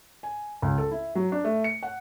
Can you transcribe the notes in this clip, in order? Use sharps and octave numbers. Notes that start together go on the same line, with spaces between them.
G#5
C#2
A4
E4
F#3
D4
A3
C#7
F#5